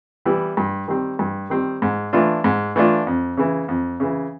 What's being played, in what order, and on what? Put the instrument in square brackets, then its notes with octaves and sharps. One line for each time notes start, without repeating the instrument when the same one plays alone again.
[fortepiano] E3 G3 B3 E4
G2
D#3 G3 C4
G2
D#3 G3 C4
G#2
E3 A3 D4 F4
G#2
E3 A3 D4 F4
F2
C#3 E3
F2
C#3 E3